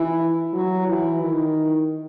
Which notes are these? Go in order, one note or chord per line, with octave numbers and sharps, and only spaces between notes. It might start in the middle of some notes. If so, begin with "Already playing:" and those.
Already playing: E3
F#3
E3
D#3